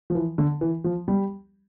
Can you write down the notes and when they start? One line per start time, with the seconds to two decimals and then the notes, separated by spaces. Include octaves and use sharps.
0.10 F3
0.15 E3
0.38 D3
0.61 E3
0.84 F3
1.08 G3